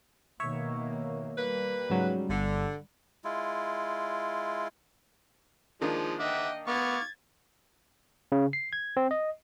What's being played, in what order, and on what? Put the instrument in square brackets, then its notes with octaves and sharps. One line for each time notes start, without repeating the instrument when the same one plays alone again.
[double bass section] B2 D#3 A#3 [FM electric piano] C#5 E5
[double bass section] G3 [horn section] A#3 B4
[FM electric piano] G#2 C#3 F#3
[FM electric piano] G1 [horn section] D3
[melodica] G#3 E4 F4
[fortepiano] D#3 A#3 D4 [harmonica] F3 G#3
[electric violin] D#5 G5 [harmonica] E5 F#5 D6
[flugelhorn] B3 [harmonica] F5 C#6 D6 [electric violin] G#6 A6
[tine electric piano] C#3
C7
G#6
C4
D#5